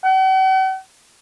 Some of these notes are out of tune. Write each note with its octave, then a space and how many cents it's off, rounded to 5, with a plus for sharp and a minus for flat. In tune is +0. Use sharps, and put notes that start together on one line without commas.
F#5 +45